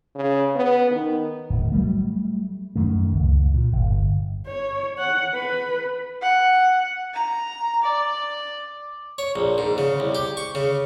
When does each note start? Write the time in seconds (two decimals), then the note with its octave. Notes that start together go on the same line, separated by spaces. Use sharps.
0.15 C#3
0.56 B3
0.91 D#3
1.50 D1
1.72 F#3 G3 A3
2.76 F#2 D#3 A3
3.13 C#2
3.54 A#2
3.72 G1
4.47 C#5
4.98 F#5
5.34 B4
6.21 F#5
7.14 A#5
7.82 D5
9.18 C#5
9.36 A#1
9.58 G#2
9.78 C#3
10.00 C2
10.15 G4
10.37 C#6
10.55 C#3